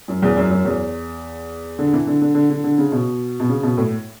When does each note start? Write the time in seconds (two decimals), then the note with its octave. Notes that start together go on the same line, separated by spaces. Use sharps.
0.08 F#2
0.22 E2
0.37 F#2
0.51 F#2
0.65 E2
1.79 D3
1.93 E3
2.07 D3
2.22 D3
2.35 D3
2.50 D3
2.64 D3
2.78 C#3
2.92 B2
3.40 B2
3.49 C#3
3.63 B2
3.77 A2